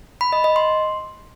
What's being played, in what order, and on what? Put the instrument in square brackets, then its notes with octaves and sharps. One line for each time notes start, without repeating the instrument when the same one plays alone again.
[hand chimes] B5
D#5
D#5
C6